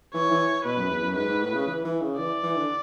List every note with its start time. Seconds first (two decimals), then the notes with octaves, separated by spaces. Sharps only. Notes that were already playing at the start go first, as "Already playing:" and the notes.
0.14 E3 C#5
0.31 E3
0.65 B2 B4
0.78 F#2
0.90 E2
1.03 F#2
1.16 G#2 B4
1.28 G#2
1.42 A2
1.54 C#3
1.67 E3
1.84 E3
2.01 C#3
2.18 E3 D5
2.43 E3
2.56 D3